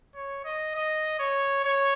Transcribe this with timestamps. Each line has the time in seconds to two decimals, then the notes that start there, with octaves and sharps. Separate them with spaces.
0.15 C#5
0.45 D#5
0.75 D#5
1.19 C#5
1.64 C#5